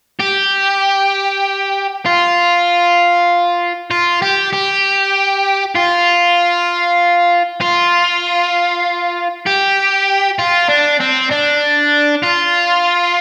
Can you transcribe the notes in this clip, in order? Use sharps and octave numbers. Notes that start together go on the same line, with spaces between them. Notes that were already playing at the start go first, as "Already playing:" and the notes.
G4
F4
F4
G4
G4
F4
F4
G4
F4
D4
C4
D4
F4